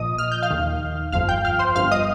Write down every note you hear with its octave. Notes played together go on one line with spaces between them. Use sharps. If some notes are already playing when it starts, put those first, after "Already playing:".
Already playing: A#1 A#2 F3 D#5 D#6
F6
G6
F5 F6
D#2 D#3
G1 F2 F3 F5 F6
G5 G6
F5 F6
C5 C6
G1 G2 F3 F5 F6
D#5 D#6